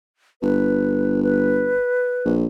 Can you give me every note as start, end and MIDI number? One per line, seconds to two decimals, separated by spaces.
0.42 1.77 31
0.42 1.21 71
1.23 2.33 71
2.25 2.47 34